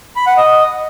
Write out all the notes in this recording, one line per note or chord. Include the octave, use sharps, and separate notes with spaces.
B5
F#5
D#5